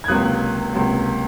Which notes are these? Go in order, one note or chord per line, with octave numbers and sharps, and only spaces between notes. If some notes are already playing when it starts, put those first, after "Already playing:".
G#6
C#2 C3 F#3 A#3 D#6 F#6
C#2 C3 F#3 A#3